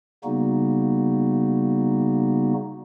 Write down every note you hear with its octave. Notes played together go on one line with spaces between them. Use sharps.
C#3 G3 A#3 B3 D#4 F#4